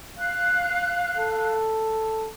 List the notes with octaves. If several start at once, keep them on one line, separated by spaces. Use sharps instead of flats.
F5 F#6
A4